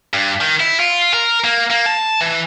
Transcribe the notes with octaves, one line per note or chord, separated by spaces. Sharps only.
G2
D#3
E4
F4
A#4
A#3
A#3
A5
E3